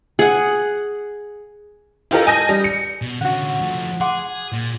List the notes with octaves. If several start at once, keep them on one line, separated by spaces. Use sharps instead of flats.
G#4 F#5
E4 F4 G4 A4 A#4 D#5
D#5 G#5 A5 D#6 G6 A#6
G3
C#7
B2
D3 C#4 F#4 F#5
F3 A3
G#4 F#5 C6 D6
A#2